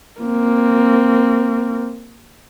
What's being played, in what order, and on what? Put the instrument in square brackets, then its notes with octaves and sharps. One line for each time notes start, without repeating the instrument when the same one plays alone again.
[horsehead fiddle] A#3 C4